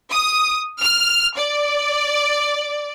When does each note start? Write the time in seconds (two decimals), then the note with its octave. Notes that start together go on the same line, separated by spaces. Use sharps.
0.12 D#6
0.80 F6
1.38 D5